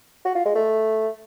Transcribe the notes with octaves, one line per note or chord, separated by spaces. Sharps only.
F#4
F4
G#3
A3